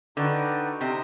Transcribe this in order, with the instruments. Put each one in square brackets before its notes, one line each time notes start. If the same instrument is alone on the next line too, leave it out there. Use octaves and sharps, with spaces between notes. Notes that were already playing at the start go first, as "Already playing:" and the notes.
[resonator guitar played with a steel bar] D3 [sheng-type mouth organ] D#4 F#4 B4 D5 G5
[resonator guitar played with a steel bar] C3 [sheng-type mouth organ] D#4 G4 C5 D#5